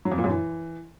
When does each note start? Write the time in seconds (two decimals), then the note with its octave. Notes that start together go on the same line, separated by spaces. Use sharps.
0.05 F#3
0.12 F2
0.18 A#2
0.24 F#2
0.30 E3